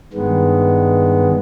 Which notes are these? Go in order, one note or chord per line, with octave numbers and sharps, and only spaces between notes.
G2 D#3 G#3 B3